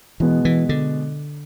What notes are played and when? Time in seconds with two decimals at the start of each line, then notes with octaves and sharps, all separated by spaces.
0.20 B2 E3 G#3 B3
0.45 E3
0.69 D3